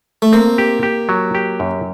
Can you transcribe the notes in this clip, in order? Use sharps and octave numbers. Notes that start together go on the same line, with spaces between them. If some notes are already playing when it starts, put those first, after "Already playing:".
A3
A#3 C4
G4
G4
F#3
G4
F#2